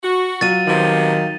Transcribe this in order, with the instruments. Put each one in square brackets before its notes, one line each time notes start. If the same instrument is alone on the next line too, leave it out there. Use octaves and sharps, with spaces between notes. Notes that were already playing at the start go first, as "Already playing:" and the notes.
[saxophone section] F#4
[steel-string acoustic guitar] F#3 F4 [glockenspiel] A6 D#7
[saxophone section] C3 F3 B3 [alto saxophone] D#3